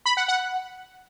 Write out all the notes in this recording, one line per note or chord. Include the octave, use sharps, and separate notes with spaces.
B5
F#5
F#5